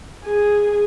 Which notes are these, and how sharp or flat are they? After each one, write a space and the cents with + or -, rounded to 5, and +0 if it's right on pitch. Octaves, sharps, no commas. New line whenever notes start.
G#4 -5